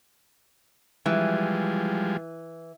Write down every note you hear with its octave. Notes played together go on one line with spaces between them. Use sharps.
E3 F3 G3 G#3